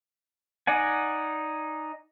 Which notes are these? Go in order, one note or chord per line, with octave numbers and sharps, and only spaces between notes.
D#4 D5 F#5 G#5